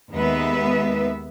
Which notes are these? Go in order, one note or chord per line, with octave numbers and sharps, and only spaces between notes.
D#2 G#3 B3 B4 E5